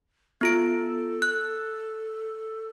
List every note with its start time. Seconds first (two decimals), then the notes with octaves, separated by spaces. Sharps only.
0.41 B3 F4 A4 D7
1.22 F#6